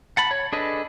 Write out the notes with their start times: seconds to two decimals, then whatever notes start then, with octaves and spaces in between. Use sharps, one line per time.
0.17 F#5 A5 B5
0.31 C#5
0.52 D4 G#4 A4 B4 D#5